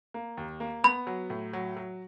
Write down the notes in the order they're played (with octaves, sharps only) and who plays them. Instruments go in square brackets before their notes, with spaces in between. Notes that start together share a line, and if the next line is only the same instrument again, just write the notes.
[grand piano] A#3
D#2
A#3
[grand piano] B3 [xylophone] B5
[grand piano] F#3
A2
F#3
F#3